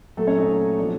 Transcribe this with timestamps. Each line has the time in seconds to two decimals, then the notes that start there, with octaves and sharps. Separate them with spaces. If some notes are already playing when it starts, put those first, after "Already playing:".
0.17 A#2 F#3 A3 A4
0.27 C#4 C#5
0.38 D#4 D#5
0.78 C3 F3 D4 D5